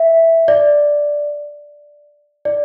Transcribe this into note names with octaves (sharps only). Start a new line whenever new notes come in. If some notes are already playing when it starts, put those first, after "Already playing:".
Already playing: E5
D5
D5